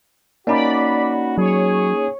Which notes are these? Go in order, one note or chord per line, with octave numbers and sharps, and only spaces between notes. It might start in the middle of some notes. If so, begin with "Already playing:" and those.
A#3 C#4 D#4 F#4 D5 B5
F#3 G#4 C#5